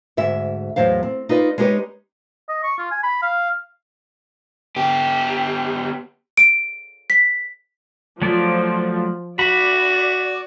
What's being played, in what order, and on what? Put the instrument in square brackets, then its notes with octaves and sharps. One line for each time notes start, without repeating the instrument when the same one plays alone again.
[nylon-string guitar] D2 G#2 E5
E2 A2 F#3 C5 F5
C4
D#4 F4 B4 D5
G#3 B3 D#4 G4 B4 C#5
[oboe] D#5
C#6
F4
G#5
B5
F5
[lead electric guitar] B3 G4
[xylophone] D7
B6
[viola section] F3 [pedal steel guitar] F#3 A3 D5
[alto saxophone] F#4 [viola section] D5 [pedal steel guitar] B5